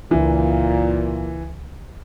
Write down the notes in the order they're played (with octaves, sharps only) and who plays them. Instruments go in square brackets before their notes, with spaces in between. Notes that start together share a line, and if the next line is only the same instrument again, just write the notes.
[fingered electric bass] C#2 D4 [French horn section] A#2 [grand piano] E3